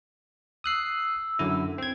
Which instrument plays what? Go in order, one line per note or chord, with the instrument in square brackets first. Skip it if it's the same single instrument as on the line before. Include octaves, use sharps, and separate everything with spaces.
[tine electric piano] D#6 F#6 C7 [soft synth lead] E6
[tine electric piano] F#2 D3 E4
C4 G#6